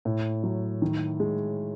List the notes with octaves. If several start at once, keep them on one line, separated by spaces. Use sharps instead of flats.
A2
F#3
D#3
G#3